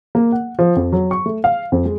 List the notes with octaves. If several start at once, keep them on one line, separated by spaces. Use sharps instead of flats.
A#3
F#5
F3
F2
F#3
C#6
A3
F5
F2
G#3